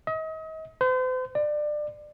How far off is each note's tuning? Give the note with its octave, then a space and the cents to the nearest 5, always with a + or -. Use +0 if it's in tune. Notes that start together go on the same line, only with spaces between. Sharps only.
D#5 +35
C5 -40
D5 +25